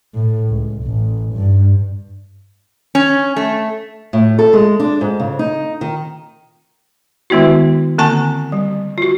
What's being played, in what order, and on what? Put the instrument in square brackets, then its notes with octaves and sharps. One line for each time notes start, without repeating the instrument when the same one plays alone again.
[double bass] A2
C#2
A1
G2
[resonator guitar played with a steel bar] C#4
A3
[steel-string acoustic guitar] A2
A4
G#3
D4
G#2
C#3
D#4
D#3
[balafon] D#3 G#3 B3 E4 F#4
D3 A#3 C4 G#5 A5 C#6
G3
F4 F#4